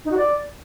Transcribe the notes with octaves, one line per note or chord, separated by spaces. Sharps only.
D#4
F#4
D5